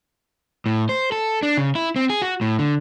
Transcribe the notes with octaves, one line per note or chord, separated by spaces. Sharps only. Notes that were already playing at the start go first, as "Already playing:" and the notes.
A2
C5
A4
D4
C#3
E4
C4
G#4
F#4
A2
D3